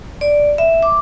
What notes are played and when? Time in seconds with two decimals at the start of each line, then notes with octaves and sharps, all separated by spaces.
0.21 D5
0.58 E5
0.83 D6